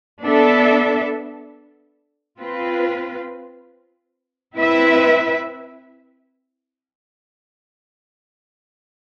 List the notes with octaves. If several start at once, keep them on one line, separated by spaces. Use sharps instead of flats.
B3 D4 A4 E5
C4 F4 B4
C4 E4 B4 E5